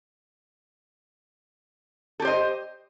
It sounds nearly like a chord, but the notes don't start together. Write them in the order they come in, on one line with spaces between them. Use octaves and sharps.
A4 G4 C5 D#5